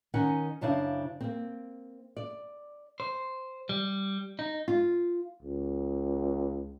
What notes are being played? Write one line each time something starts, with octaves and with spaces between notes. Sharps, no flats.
D#3 C#4 D#4 A#4 F#5 G#5
F#2 C#3 D4 E4 C5 F5
A#3 C4
D5
C5
G3
D#4
F4
C#2